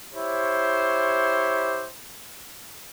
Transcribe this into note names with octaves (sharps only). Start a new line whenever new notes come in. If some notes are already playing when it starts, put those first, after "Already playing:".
E4 G4 C5 C#5